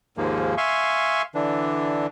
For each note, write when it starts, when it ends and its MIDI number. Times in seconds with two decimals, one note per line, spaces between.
0.17 0.55 39
0.17 0.55 44
0.17 0.55 53
0.17 0.55 56
0.17 0.55 58
0.57 1.22 76
0.57 1.22 77
0.57 1.22 80
0.57 1.22 84
0.57 1.22 85
1.35 2.07 50
1.35 2.07 52
1.35 2.07 62